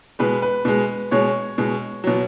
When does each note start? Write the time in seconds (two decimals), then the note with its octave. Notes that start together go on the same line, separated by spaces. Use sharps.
0.19 B2 G#3 B4
0.42 B4
0.65 B2 G#3
1.11 B2 G#3 C#5
1.58 B2 G#3
2.04 B2 F#3